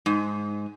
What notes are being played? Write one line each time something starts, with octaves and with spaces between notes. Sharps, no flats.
G#2